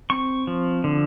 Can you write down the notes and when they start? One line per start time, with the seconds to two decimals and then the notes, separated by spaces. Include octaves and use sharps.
0.10 C4 C#6
0.47 F3
0.84 D3